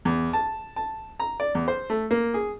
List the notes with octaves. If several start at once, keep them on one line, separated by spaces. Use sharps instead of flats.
E2
A5
A5
A#5
D5
E2
C5
A3
A#3
G#4